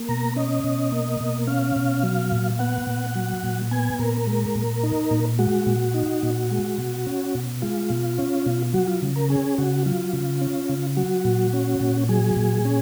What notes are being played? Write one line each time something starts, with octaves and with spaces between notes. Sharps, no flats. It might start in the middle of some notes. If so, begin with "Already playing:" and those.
Already playing: A#3
B2 A#5
C#4 D#5
B2
A#3
B2
C#4 F5
B2
F#3
A#2
B3 F#5
A#2
F#3
A#2
B3 G#5
A#2 A#4
G#3
A#2
D#4
A#2
G#3 F#4
A#2
D#4
A#2
G#3
B2
C#4
B2
G#3 F4
B2
C#4
B2
F#3 F#4
F4
C#3
A#4
C#4 G#4
C#3 F#4
F#3 F4
C#3
C#4
C#3
F#3 F#4
A#2
C#4
A#2
F#3 G#4
A#2
C#4